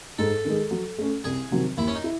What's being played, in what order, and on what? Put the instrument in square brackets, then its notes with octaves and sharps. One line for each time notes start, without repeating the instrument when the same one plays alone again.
[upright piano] G#2 [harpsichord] A4
[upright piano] D#3 G#3
F#3
A3 C#4
[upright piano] C2 [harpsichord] G#4
[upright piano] C3 D#3 F#3 C4
[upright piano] D#2 [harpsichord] E4
[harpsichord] C#4
D#4
[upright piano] E4